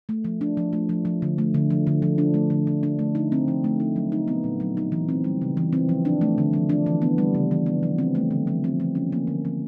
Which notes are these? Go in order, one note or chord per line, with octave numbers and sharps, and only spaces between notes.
A3
F3
D4
F3
A3
F3
F3
D3
A3
D3
F3
D3
F3
D4
A3
D3
F3
D4
A3
D#4
C4
F3
A3
D#4
F#3
D#4
B3
A#2
F#3
D#4
E3
C4
G3
C#3
E3
C4
F3
D4
A3
D3
F3
D4
E3
B3
G3
C#3
E3
B3
F3
C4
A3
D3
F3
C4
F3
C#4
A#3
D3
F3